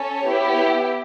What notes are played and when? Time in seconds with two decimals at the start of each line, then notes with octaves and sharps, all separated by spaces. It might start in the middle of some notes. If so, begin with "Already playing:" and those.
Already playing: C#4 A4 C#5
0.25 B3 E4 G4